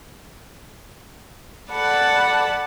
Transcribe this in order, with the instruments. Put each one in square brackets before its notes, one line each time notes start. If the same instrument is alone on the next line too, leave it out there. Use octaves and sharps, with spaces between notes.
[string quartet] A4 D5 F#5 A5 B5